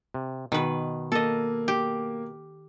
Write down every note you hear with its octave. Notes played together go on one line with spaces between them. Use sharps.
C3
B2 D#3 B4
A#3 A4 D#5
G4